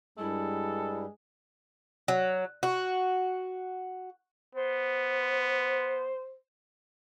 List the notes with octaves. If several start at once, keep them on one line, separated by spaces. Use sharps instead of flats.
G2 G3 G#3 E4 A4
F#3
F#4
B3 C5